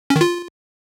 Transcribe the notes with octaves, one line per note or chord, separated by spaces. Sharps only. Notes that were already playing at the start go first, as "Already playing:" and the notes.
C#4
D#3
F4